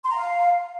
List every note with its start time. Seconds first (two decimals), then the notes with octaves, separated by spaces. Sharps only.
0.04 C6
0.10 A#5
0.16 F5